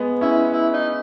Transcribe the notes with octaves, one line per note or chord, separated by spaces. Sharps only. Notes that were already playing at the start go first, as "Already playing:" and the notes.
Already playing: G#3 B3
C#4 E4
E4
D#4